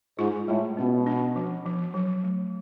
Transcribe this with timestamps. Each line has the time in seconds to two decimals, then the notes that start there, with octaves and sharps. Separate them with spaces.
0.19 G#2 F4
0.48 A2 G#3
0.77 B2 C#4
1.06 D4
1.36 F3
1.66 F3
1.94 F#3
2.24 A3